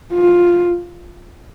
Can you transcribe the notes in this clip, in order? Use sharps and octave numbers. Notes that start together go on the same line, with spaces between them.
F4